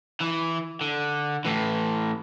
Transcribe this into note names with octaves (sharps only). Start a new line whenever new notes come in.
E3
D3
A2 E3